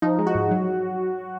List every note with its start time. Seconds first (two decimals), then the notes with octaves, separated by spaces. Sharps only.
0.02 F3 D#4
0.19 G#3
0.27 F#4
0.35 G#2
0.51 F#3